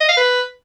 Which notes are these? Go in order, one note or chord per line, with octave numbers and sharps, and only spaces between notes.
D#5
F5
B4